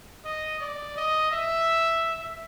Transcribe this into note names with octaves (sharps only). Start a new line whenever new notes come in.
D#5
D5
D#5
E5